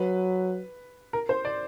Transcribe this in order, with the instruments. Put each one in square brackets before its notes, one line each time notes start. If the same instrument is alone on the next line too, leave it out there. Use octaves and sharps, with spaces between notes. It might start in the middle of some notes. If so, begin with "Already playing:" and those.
Already playing: [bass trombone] F#3 [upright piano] B4
[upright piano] A#4
C5
D5